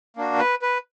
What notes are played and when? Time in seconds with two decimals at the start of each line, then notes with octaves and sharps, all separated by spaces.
0.17 A#3 D4 F#4
0.39 B4
0.62 B4